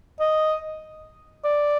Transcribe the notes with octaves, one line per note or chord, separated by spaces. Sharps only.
D#5
D5